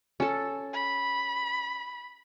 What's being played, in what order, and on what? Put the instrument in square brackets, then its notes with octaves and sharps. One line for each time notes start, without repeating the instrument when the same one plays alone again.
[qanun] C#4 A4
[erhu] B5